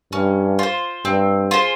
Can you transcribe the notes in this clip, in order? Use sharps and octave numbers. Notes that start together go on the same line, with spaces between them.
G2 C#4
F4 C5
G2 C4
F4 G#4 C5